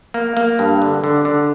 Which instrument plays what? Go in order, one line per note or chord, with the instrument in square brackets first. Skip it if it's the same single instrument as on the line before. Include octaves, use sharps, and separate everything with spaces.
[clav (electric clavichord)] A#3
A#3
G2
D3
D3
D3